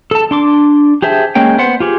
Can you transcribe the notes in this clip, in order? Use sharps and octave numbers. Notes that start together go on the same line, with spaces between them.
A4 A5
D4 C6 D6
G4 G#4 C5 E5 A5
G#3 A#3 C#4 G5
B3 C5 F#5
F4 G4 G#4